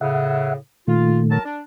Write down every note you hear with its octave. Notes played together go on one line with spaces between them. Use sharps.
A2 C#3 E5 F#5
A#2 D#3 A3 F4
F#3 A#4 A5
D4